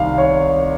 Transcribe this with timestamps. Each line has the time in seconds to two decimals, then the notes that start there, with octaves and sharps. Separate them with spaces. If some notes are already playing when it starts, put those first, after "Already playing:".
Already playing: C2 C3 D#3 F5
0.18 C#5